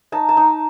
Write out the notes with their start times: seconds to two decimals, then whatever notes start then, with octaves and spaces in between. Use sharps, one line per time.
0.12 D#4 A5
0.29 A5
0.37 D#4